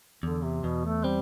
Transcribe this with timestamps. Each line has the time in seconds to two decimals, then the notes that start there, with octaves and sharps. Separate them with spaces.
0.23 E2 D3
0.43 C3
0.64 E2 B2
0.85 A3
1.04 G3 C4